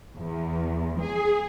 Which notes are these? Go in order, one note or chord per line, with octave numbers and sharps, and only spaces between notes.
E2
G#4